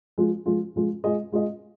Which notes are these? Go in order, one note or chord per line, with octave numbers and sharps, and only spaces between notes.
F3 G#3 F4
F3 G#3 F4
F3 G#3 F4
G#3 F4 G#4 D#5
G#3 F4 G#4 D#5